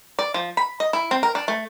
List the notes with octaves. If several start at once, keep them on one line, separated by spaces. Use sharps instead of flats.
D5
F3
B5
D#5
E4
C4
A#4
D4
A3